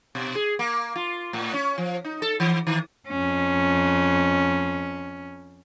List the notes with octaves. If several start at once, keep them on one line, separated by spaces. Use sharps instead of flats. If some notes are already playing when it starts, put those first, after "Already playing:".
B2
G#4
A#3
F4
A2
C#4
F3
D#4
A4
E3
D#3
F2 C#4